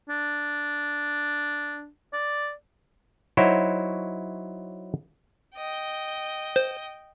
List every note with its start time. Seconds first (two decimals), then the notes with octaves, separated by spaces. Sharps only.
0.09 D4
2.13 D5
3.37 F#3 D#4 E4 F#4 C5 C#5
5.56 D#5 G5
6.56 C5